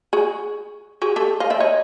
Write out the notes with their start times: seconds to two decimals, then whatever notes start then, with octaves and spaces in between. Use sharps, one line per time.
0.13 F#4 G#4
1.02 F#4 G#4
1.16 G4 A4
1.40 D#5 F5
1.50 D5 E5
1.60 C#5 D#5